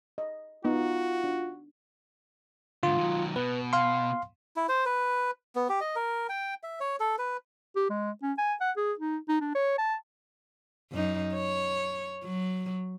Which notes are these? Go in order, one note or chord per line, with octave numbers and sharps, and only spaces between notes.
D#5
B3 D#4 F4 F#4
D4
G#2 D3 F4
D#3 F#3
B2 B4
F5 C6
E4
C5
B4
B3
G4
D#5
A#4
G5
E5
C#5
A4
B4
G4
G#3
C#4
G#5
F#5
G#4
D#4
D#4
D4
C#5
A5
F#2 D#4
C#5
F#3